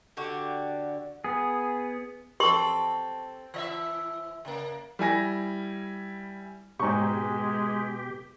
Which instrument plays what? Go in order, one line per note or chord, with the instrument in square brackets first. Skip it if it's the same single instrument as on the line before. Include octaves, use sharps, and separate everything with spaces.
[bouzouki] D3 D4 F#4 G4
[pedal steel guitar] B3 G#4
[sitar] C4 A4 [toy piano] G4 C6 C#6
[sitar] E3 D#5 E5
C#3 A#3
[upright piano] G3 E4 G#5 A#6
[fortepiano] G#2 C#6 [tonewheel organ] B2 G4 [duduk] G#3